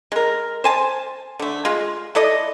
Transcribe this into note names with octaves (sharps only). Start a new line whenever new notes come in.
G#3 A#4
C5 G#5 A5
D3 A3
G#3 F4
E4 A4 D5 D#5